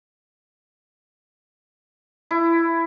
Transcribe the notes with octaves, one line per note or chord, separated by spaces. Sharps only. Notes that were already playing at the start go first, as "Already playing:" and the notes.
E4